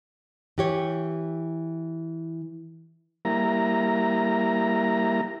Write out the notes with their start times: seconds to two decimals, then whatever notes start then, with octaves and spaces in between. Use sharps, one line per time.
0.58 E3 G4 C#5
3.25 G3 A#3 E4 A#5